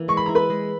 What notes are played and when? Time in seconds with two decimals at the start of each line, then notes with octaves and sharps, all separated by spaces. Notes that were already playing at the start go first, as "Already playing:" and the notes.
Already playing: E3 A#3
0.08 G#3 C#6
0.17 B5
0.26 E4 A#5
0.35 B4 B5
0.50 G#3